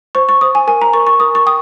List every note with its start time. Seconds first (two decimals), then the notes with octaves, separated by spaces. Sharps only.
0.15 C5 C#6
0.29 C#6
0.41 C5 D#6
0.55 G#5
0.67 A#4 G#5
0.82 A#5
0.94 A#4 C#6
1.07 C#6
1.20 A#4 D#6
1.35 C#6
1.46 G5 D#6